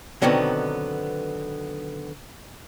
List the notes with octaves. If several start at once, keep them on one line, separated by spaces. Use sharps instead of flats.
B2 D3 D#3 F#3 B3 C4